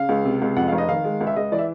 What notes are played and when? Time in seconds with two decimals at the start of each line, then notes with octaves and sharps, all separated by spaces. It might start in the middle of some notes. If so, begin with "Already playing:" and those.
Already playing: C#3 F5
0.09 C#2
0.25 C3
0.42 C#2
0.56 F2 F#5
0.68 F1 F5
0.78 D#5
0.89 D#3 F5
1.04 G#3
1.21 C#2
1.27 E5
1.36 C#2 D#5
1.52 E3 D5
1.59 E5